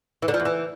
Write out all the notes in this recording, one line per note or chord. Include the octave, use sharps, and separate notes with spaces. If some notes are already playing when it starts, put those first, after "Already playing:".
E3
D3
F3
E2
E3